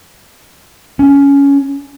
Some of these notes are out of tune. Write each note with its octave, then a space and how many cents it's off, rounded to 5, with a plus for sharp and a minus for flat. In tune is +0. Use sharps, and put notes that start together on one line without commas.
C#4 +15